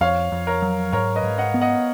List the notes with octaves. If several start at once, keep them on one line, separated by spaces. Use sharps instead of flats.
F2 C#5 F5
F2
A#4 C#5
F#3
G#2 A#4 C#5
B4 D#5
G#2
D#5 F#5
B3
D#5 F#5